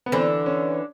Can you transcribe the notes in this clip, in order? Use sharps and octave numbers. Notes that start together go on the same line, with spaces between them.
B3
D3 E3 C4
C#4